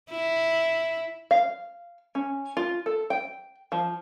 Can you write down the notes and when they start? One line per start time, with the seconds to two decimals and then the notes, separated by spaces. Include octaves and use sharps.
0.11 E4
1.31 F5
2.15 C#4
2.57 F4
2.86 A4
3.10 G5
3.72 F3